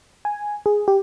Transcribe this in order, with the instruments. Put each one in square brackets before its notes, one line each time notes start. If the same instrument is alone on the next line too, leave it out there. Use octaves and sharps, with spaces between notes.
[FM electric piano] G#5
G#4
G4